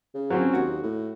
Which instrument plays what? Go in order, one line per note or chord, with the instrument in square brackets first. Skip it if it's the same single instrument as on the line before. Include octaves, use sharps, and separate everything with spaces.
[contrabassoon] C#3
[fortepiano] F#3 C4 C#4
[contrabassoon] D#2 [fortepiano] F#4
[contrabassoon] A2